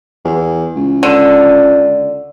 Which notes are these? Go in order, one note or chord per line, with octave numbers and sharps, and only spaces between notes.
E2
C#2
D3